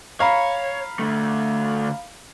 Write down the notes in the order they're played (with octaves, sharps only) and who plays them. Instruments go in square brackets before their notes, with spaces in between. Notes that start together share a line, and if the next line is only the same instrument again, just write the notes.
[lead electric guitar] C#5 [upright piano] F5 A#5 B5
[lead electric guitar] D3 A3